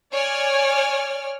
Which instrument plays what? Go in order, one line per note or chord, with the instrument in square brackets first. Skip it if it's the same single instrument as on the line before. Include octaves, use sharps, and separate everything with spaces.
[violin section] C#5 D5 G#5 F6